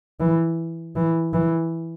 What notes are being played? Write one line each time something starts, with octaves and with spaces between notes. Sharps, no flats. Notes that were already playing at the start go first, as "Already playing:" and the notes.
E3
E3
E3